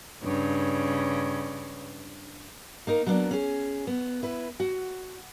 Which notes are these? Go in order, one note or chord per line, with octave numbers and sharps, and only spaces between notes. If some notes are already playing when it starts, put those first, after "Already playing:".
G2 C#3
A#3 D#4 A#4
F#3 A#3 B3 C#4 D4
C#4 G#4
B3
E4 B4
F#4